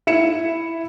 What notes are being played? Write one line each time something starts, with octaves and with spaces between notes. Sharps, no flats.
E4 C#7 E7